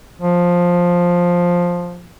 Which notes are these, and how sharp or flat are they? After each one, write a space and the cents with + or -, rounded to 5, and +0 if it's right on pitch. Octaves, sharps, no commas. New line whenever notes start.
F3 +10